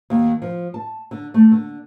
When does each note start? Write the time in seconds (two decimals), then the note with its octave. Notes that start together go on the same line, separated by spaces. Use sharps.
0.10 D#2
0.42 F3
0.74 A5
1.11 D3
1.34 A3
1.51 D3